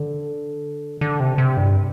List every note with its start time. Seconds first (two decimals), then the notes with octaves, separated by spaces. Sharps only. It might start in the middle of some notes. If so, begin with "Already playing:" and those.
Already playing: D3
1.01 D3
1.20 C3
1.38 C3
1.57 G2